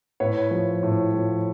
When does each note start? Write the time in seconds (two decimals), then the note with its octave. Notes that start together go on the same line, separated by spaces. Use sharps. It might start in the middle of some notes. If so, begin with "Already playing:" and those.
0.20 A2 B4 C#5
0.51 F3
0.83 A2
1.14 F3